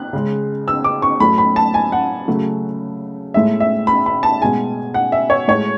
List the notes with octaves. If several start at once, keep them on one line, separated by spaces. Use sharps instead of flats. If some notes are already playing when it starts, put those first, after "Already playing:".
Already playing: F#6
C#3 G#3
E6
D6
C#6
A2 F#3 A3 B5
B5
A5
G#5
F#5
C#3 F#3 A3
A2 G#3 E5
E5
B5
B5
A5
B2 G#3 G#5
F#5
E5
C#5
A2 G#3 C#5